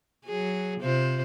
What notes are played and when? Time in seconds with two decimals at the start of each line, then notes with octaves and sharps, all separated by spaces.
0.25 F#3 G#4
0.80 C3 F4 C5